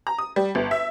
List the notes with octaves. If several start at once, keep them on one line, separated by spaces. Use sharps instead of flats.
A#5
D#6
G3
G1
E5